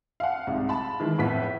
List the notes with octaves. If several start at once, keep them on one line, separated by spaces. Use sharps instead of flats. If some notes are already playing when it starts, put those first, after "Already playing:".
F5 F#5
C2 G#2 G#3
A5 B5
D#3 E3 G#3
F2 A2 B3 B6